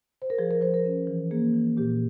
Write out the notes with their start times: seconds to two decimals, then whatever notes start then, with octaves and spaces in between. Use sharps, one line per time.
0.22 C5
0.30 A#4
0.38 F3 G#4
0.51 A#4
0.61 F3 C5
0.74 A#4
0.85 C#4
1.07 E3
1.31 A#3 G#4
1.53 E3
1.77 A#2 G4